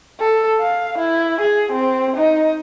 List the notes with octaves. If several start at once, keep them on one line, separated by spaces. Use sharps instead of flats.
A4
F5
E4
G#4
C4
D#4